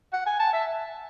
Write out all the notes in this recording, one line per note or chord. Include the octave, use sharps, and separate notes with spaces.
F#5
G#5
A5
E5